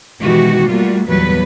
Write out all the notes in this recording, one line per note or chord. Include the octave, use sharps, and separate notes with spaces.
B2 D#3 E3 G#3 F#4 G4
G3 A3 A#3 F4 F#4
E2 A#2 F#3 G3 B3 B4